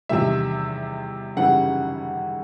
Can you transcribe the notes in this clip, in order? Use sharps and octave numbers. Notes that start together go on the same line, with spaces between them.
E2 C3 D#3 G3 E5
G#1 F#2 C#3 E3 G3 F#5